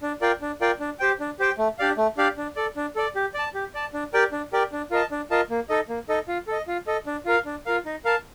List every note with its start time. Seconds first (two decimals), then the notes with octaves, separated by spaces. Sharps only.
0.03 D4
0.21 F4 A#4 D5 G5
0.42 D4
0.61 F4 A#4 D5 G5
0.80 D4
0.99 G4 C5 G5
1.20 D4
1.40 G4 C5 G5
1.58 A3
1.79 D4 G4 D5 F5
1.97 A3
2.17 D4 G4 D5 F5
2.37 D4
2.56 A4 D5
2.76 D4
2.96 A4 D5
3.16 G4
3.34 D5 A5
3.54 G4
3.75 D5 A5
3.94 D4
4.14 G4 A#4 D5 G5
4.32 D4
4.53 G4 A#4 D5 G5
4.72 D4
4.91 F4 A#4 D#5 A5
5.11 D4
5.31 F4 A#4 D#5 A5
5.50 A#3
5.69 D#4 A4 D#5
5.89 A#3
6.09 D#4 A4 D#5
6.28 F4
6.48 A4 D#5
6.67 F4
6.87 A4 D#5
7.07 D4
7.26 F4 A#4 F5
7.45 D4
7.66 F4 A#4 F5
7.86 D#4
8.05 A#4 F5 A5